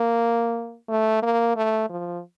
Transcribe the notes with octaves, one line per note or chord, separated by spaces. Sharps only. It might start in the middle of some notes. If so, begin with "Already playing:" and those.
Already playing: A#3
A3
A#3
A3
F3